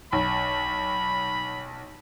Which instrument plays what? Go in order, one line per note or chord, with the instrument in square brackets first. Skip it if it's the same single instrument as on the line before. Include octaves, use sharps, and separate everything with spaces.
[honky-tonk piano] B1 [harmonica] B5